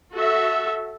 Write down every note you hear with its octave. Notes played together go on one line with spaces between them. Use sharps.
F#4 A4 E5